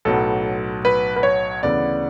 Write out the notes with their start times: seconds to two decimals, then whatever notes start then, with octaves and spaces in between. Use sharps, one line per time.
0.05 B1 A2 F#3 B3 A4
0.85 B4
1.16 B4
1.23 C#5
1.63 D2 C#3 E3 B3 D5